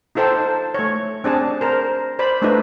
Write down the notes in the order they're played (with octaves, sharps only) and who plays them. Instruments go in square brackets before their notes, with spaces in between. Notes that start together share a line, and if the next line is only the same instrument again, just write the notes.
[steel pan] D#4 F4 A4 C5 G5 A5
A3 C#5
C4 D4 G#4 A5
A#4 C5
C5 D5 B5
A3 D4 D#4 F4 A4 B4